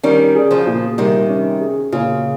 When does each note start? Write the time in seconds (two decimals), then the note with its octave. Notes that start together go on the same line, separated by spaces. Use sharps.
0.03 D#3 G3 C#4
0.35 G#4
0.51 C#3 F3
0.67 A#2
0.98 C3 D#3 G3
1.29 C#4
1.61 G#4
1.92 A#2 C#3